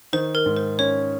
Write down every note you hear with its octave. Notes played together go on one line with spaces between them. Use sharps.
D#3 C5
A#4
G#2
C5
C#4 C#5